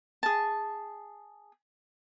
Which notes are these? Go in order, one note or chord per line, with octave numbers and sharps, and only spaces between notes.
G#4 A5